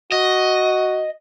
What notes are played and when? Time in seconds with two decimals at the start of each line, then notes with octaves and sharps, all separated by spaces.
0.12 F#4 D#5